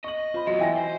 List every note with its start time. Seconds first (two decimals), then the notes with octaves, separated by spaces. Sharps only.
0.04 D#5 C#6 F#7
0.34 F4 C5 B5
0.47 G#2 B2 F#3 D#5
0.59 E3 E5 G5 G#5 A#6
0.78 C5